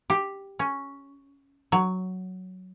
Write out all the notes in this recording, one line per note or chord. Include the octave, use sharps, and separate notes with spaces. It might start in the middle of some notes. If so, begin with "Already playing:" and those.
G4
C#4
F#3